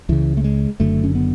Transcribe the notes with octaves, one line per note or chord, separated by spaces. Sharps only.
C#2 C#3 E3
A3
G#3
F#1 F#2 D3 A3
C#4
B3